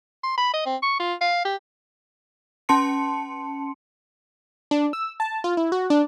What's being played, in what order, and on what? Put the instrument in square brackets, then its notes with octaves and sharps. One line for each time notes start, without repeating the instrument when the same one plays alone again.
[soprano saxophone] C6
B5
D#5
C4
C#6
F4
F5
G4
[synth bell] C#4 A5 C6 C#7
[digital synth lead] D4
E6
A5
F4
E4
F#4
D4